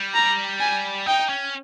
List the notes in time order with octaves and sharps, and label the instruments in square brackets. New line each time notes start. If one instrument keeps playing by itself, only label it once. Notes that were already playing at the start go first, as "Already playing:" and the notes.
Already playing: [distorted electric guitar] G3
[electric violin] A#5
G#5
[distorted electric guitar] D#4 [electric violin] G5
[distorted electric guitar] C#4